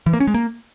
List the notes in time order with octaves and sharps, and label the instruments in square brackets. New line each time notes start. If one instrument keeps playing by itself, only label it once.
[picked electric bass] E3
A#3
C#4
G#3
A#3